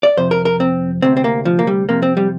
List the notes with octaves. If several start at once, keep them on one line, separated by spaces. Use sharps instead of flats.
D5
F2 C3 C5
A#4
A#4
C4
D2 C3 C4
C4
A#3
F3
A#3
G3
F2 C3 A#3
C4
G3